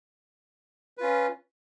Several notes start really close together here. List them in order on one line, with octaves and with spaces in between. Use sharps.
B4 F4 C#4